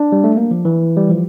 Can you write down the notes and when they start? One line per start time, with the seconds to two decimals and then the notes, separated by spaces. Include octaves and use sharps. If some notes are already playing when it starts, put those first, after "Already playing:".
Already playing: D4
0.12 G3
0.24 A3
0.37 A#3
0.51 F3
0.65 E3
0.97 G3
1.09 F3